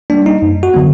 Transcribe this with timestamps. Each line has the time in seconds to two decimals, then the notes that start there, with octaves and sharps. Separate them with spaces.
0.10 G3 A#3 D4
0.26 D#4
0.42 F#2
0.63 F#4
0.74 D3 F#3 B3